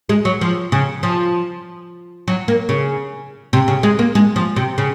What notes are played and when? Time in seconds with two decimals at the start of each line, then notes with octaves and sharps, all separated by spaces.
0.09 G#3
0.25 F#3
0.41 F3
0.72 C#3
1.03 F3
2.28 F#3
2.48 A#3
2.69 C#3
3.53 C3
3.68 C#3
3.83 G#3
3.99 A#3
4.15 G#3
4.36 F3
4.56 C3
4.78 C#3